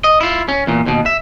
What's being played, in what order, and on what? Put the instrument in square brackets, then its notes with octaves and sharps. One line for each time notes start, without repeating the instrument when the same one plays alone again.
[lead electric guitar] D#5
E4 F4
C#4
E2 A#2
D#2 B2
E5